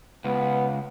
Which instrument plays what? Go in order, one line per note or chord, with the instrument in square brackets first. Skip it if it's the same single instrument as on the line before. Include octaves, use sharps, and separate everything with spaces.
[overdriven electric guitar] C#2 [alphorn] B3